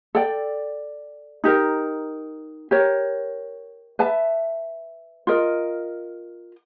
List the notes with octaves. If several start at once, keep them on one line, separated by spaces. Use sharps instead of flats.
A4 D5 G5
D#4 G4 A#4
G4 A#4 C#5
B4 E5 A5
F4 A#4 D#5